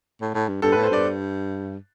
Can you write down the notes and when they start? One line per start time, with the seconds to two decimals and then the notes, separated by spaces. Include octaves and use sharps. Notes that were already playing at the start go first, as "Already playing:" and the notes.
0.21 A2
0.35 A2
0.48 G2
0.62 G2 A4
0.72 A2 B4
0.83 C5
0.90 G2 D5